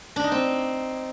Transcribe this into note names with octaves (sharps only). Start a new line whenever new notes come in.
D4
D#4
C4